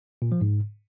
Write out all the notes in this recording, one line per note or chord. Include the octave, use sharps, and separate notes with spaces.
A#2
F3
G#2